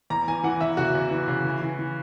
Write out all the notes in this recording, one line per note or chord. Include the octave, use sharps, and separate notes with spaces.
E2 A#5
E3 G#5
E3 F#5
E2 E5
C#3 F#4
E2
E3
C#3
E3
E3
E3